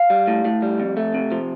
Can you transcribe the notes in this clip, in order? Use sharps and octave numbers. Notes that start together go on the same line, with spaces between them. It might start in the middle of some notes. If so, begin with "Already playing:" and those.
Already playing: F5
G3
A2
A2
G3
F2
A3
C3
F3